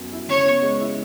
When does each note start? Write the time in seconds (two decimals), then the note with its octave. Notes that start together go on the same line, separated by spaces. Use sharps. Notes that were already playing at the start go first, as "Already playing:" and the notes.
Already playing: F#2 F#3 B3
0.12 E4
0.28 C#3 C#5
0.45 B3
0.62 G#3
0.80 E4